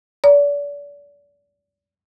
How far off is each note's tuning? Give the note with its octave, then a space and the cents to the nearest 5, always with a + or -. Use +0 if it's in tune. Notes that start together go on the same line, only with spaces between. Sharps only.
D5 -35